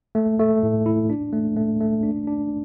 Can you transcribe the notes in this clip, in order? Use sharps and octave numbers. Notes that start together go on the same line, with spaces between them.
A3
A3
A2
E4
D4
A3
A3
A3
D4
D4